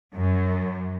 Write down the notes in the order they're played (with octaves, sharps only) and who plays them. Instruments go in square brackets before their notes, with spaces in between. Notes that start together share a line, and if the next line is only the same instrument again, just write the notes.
[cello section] F#2